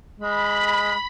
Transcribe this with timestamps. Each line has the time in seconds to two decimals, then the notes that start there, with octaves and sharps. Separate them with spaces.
0.20 G#3 B5